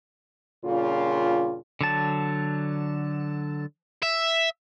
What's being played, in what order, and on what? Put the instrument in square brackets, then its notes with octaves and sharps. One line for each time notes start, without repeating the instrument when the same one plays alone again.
[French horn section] G2 A#2 C#3 F4
[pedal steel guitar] D3 F#3 A5
[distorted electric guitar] E5